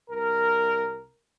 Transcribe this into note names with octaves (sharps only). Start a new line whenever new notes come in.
C2 A#4